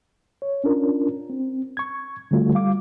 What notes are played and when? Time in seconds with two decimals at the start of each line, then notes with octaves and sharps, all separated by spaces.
0.42 C#5
0.64 C#4 D4 F4 A#4
1.30 C4
1.77 C#6 G#6
2.31 D3 G3 A3 F4 F#4
2.54 G3 F5 D6